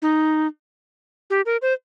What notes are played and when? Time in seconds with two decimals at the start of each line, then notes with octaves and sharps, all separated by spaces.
0.02 D#4
1.30 G4
1.46 A#4
1.62 C5